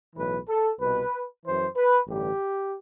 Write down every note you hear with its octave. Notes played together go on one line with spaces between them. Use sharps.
B1 A2 E3 B4
A4
C2 B2 B4
F#2 E3 C5
B4
A1 G2 D3 G4